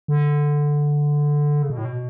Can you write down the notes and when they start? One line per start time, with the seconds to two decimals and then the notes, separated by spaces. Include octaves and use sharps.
0.08 D3
1.62 C#3
1.70 B2
1.78 A2
1.85 B2